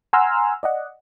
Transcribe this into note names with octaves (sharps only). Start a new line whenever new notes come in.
F#5 G#5 A#5 C6 E6 F6
D5 D#5 F#5